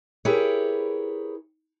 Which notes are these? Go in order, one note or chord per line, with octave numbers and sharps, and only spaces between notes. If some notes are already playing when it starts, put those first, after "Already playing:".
E4 G4 G#4 A#4 B4 C#5